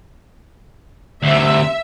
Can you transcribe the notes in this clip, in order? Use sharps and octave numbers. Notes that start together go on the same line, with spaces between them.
D2 C3 E5